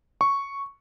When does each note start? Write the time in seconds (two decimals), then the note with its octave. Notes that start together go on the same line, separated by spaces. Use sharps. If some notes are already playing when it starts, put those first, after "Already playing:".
0.21 C#6